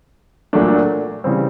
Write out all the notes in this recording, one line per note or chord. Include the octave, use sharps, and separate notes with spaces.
A#2 F#3 A3 D4
C#3 E3 G3 C4